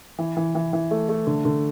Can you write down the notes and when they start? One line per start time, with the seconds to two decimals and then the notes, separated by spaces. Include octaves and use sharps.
0.19 E3
0.37 E3
0.55 E3
0.73 E3
0.91 A3
1.09 A3
1.27 D3
1.45 D3